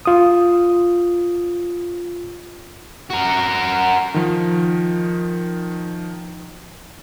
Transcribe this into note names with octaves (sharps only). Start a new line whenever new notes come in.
F4 D#6
F#4 A#4
D#3 F3